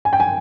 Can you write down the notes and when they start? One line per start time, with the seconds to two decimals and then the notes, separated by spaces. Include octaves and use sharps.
0.05 G#5
0.13 G5
0.20 G#5